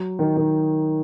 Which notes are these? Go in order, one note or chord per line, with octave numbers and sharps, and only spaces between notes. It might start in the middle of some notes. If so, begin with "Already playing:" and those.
Already playing: F#3
D#3
D#3